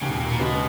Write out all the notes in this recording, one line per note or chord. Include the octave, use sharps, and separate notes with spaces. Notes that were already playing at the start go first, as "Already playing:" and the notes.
D#2 C#3
B2
A#2
B2
C#3 G#3 B3 F#4